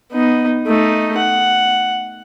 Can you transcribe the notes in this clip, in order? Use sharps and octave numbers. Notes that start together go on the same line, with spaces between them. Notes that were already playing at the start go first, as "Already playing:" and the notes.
B3 D#4
A3 D#4
F#5